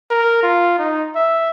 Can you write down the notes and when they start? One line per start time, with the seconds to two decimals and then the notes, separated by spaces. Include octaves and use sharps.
0.11 A#4
0.43 F4
0.79 D#4
1.16 E5